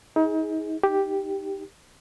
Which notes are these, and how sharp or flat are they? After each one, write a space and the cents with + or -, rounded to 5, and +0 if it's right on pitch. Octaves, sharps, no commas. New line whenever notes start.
D#4 +35 G#4 +0
D#4 +0 G4 +0